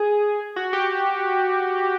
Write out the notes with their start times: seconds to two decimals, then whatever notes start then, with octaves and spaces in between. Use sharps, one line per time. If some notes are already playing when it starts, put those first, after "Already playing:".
Already playing: G#4
0.56 F#4
0.73 G4